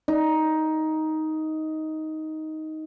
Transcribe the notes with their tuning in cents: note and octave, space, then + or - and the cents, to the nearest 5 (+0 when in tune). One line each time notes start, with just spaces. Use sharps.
D#4 +10